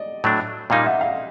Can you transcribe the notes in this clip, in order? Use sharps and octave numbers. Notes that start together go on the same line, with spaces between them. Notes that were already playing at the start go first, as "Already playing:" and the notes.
Already playing: D5 D#5
A2 F#3 A3 D4
A#2 G3 A#3 D#4 D#5 F5
E5 F#5
D#5 F5